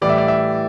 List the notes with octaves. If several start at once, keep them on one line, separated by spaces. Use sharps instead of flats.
A2 E3 G3 D5
E5
D5
E5